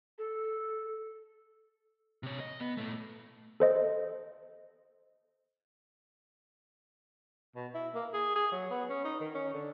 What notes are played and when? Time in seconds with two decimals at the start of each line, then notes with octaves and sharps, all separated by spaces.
0.18 A4
2.23 C3 C#5
2.40 D#5
2.60 B3
2.77 A#2 A3
3.60 A4 C5 D#5
7.55 B2
7.74 E4
7.94 A#3
8.13 G#4
8.36 G#4
8.52 F#3
8.70 B3
8.89 C#4
9.05 D#4
9.20 D#3
9.35 C#4
9.53 D3